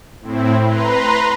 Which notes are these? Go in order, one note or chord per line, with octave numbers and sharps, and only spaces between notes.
A2 C4 E4
B4 A#5 C6